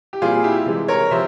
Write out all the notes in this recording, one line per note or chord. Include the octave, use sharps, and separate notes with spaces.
G4
A#2 G3 C4 F4 G#4
E4 G4
C3 E3 G#3
A#4 C#5
C3 F3 C5 E5